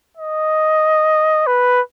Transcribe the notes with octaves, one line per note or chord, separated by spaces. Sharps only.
D#5
B4